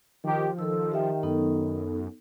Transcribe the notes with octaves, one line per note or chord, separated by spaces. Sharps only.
D#3 F3 G4
D#3 A4 E6
G4 E5 G5
F#2 B3 D#4 A4